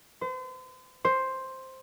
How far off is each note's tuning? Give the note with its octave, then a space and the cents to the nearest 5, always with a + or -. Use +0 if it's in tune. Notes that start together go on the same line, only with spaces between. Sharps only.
C5 -40
C5 +5